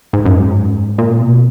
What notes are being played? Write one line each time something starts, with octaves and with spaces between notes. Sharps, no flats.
G#2
F#2
G#2
A#2
B2